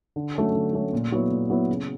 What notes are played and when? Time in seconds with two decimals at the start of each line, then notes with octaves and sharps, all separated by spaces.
0.16 D3
0.35 F#3 A3 C#4
0.55 D3
0.73 F#3 A3 C#4
0.93 A#2
1.12 F#3 B3 E4
1.31 A#2
1.50 F#3 B3 E4
1.69 C#3